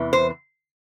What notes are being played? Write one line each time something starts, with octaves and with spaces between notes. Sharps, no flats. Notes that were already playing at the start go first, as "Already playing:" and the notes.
Already playing: E2 C3 E3
C5